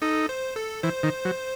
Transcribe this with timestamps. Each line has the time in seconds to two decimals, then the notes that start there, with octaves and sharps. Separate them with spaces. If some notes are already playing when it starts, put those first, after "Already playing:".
0.02 D#4 A4
0.29 C5
0.56 A4
0.83 E3 C5
1.03 D#3
1.25 F#3